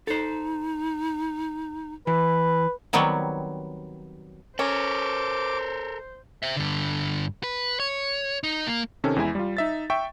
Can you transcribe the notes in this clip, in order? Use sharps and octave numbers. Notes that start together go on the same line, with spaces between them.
D#4 A4 C5
E3 B4
D#3 F#3 G3 B3 C4 C#5
C#4 A4 A#4 C5 D6
C5 E5
G2 D3
B4
C#5
D#4
A#3
C3 D#3 C#4 A4
E2 G#3 E4 G#5
G3 F4
D#4 E5 A6
E5 G5 C#6